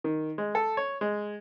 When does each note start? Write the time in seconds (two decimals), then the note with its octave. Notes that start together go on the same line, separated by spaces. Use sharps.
0.04 D#3
0.38 G#3
0.55 A4
0.77 C#5
1.01 G#3